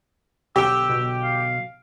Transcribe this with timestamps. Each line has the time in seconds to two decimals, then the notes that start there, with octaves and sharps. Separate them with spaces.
0.56 B1 D3 G4 G5 E6
0.89 B2
1.23 F5